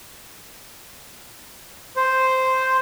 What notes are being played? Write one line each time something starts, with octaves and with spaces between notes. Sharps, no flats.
C5